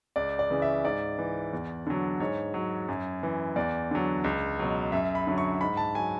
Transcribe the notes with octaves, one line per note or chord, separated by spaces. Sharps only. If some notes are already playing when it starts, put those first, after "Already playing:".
C#2 D5
D5
C#3 E3
E5
G#2 D5
E3
E2
D3 F#3
G#2 C#5
F#3
F#2
E3
E2 D5
D3 F#3
C#2
B2 F#3
F#2 E5
B5
D3 F#3
C#6
G#2 B5
A5
F#3 G#5